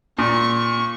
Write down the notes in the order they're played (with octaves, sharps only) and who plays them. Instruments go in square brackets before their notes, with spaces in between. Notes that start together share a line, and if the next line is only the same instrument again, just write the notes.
[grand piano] A#2 [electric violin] C#6